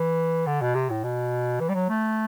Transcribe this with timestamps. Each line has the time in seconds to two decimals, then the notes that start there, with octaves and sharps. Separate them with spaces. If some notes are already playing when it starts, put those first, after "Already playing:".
Already playing: E3
0.46 D3
0.62 B2
0.75 C3
0.90 A2
1.04 B2
1.60 E3
1.69 G3
1.74 F#3
1.89 A3